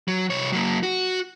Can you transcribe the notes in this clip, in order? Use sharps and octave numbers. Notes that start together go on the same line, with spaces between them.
F#3
C2 C#5
F#3 A#3
F#4